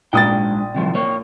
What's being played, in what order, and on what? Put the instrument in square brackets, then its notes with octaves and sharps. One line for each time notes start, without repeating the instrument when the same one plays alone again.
[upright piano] A#1 D#6 A6 [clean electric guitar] G#2 D4 G5
[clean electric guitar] C3 D#3 F3
A#3 C#5